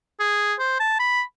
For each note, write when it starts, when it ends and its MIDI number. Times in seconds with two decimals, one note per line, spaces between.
0.20 0.54 68
0.59 0.78 72
0.80 0.96 81
0.99 1.22 83